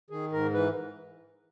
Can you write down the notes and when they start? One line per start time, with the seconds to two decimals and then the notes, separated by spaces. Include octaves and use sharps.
0.10 D#3 G#4
0.32 G#2 A#4
0.53 E3 B4